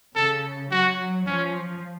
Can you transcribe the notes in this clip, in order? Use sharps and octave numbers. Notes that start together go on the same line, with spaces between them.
C#3 A4
F#3 F#4
F3 C#4